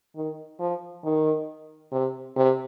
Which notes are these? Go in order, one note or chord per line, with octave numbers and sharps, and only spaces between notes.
D#3
F3
D#3
C3
C3